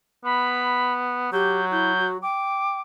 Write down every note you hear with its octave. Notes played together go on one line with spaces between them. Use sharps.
B3 B5
F#3 G4 G6
E4 G6
F#4
G5 D6